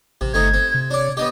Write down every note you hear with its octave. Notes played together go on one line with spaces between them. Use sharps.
A1 C3
G1 A3 C4 D#4 G#6
C4
C3
D4 C#5 D5
B3 D4 G4 D#5